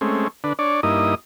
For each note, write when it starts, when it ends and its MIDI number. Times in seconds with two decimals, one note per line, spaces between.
0.01 0.28 56
0.01 0.28 57
0.01 0.28 60
0.01 0.28 61
0.44 0.53 50
0.44 0.53 62
0.44 0.53 71
0.59 0.81 62
0.59 0.81 73
0.59 0.81 74
0.83 1.15 43
0.83 1.15 58
0.83 1.15 63
0.83 1.15 64
0.83 1.15 75